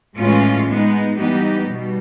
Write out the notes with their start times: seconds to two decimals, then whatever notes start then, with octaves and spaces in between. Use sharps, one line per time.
0.19 A2 E3 G#3 C#4 F4
0.68 G#3 B3 D#4
1.18 E3 G3 B3 D#4 G4
1.67 B2 G3